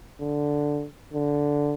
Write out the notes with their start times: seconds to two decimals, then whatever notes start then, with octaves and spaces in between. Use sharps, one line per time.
0.20 D3
1.13 D3